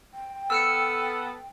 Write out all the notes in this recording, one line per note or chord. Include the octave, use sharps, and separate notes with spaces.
G5
B3 A4 E6 F6 C#7